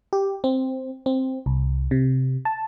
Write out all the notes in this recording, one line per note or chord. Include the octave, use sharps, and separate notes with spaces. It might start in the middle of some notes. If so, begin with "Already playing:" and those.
G4
C4
C4
C2
C3
A5